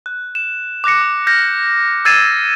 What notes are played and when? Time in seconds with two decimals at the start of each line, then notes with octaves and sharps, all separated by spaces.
0.06 F#6
0.35 E7
0.84 D6 F#6 A#6 C#7
1.01 D6
1.27 F6 G6 A#6
2.05 E6 G#6 A6 C7 D#7 E7